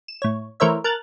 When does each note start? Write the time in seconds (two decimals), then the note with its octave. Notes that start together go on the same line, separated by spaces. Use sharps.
0.08 E7
0.22 A2 C#5
0.60 E3 A3 A#4 C5 C#5 E5
0.84 A#4 A5 F6 F#6 A6